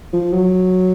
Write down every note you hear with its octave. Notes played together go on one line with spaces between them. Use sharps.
F3
F#3